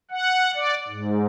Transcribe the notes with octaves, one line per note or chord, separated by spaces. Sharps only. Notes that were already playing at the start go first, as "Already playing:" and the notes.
F#5
D5
G#2